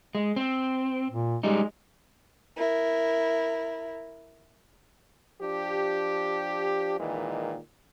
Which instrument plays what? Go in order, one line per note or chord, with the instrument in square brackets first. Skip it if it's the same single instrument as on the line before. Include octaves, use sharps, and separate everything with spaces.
[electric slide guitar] G#3
C4
[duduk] A#2
[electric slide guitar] G3 D#4 [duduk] G#3
[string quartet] E4 A#4
[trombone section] F3 D4 G4
A#2 D#3 E3 G#3